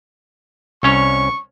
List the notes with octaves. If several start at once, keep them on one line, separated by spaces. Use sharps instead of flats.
C2 C#4 C#5 C#6